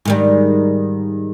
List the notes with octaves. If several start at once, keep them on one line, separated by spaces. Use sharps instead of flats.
G#2 D#3 G3